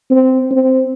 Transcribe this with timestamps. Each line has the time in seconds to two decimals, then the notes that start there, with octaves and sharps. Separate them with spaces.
0.11 C4
0.51 C4